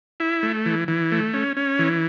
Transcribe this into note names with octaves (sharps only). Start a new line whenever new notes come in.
E4
A3
E3
E3
A3
C#4
C#4
E3